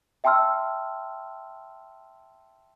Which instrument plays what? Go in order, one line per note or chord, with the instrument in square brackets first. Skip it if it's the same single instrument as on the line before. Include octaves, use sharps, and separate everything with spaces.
[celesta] E5 G5 A5 C6 E6 F6